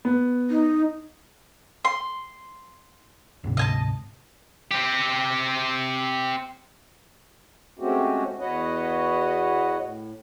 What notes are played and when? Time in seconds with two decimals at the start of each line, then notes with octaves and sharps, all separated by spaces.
0.05 B3
0.51 D#4
1.85 C6
3.44 D2 G#2 C3
3.57 D#5 G#5 A5
4.71 C4 G4
7.79 G#3 A3 C4 C#4 F#4 G4
8.39 E2 F#4 B4 C#5 D#5 F#5
9.80 A2